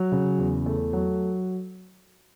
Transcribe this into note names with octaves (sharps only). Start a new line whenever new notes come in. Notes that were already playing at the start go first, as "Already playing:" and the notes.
Already playing: F#3
C#3
E2
A3
F#3